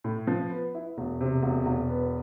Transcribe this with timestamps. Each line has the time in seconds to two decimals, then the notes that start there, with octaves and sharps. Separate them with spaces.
0.04 A2
0.27 F3
0.50 B3
0.75 E4
0.98 E1
1.21 C3
1.43 E1
1.66 E1
1.89 B3